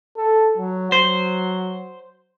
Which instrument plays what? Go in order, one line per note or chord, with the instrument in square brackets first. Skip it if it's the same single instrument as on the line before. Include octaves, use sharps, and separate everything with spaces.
[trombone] A4
F#3
[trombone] F#3 [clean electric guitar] C5